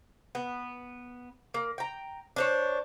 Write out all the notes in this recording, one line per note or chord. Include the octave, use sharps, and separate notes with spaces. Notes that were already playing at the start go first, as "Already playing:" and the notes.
B3
A#3
G5 A#5
D4 C5 C#5